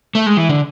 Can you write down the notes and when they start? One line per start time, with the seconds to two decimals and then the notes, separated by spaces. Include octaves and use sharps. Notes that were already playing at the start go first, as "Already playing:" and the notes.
0.15 A3
0.26 G#3
0.37 E3
0.49 D3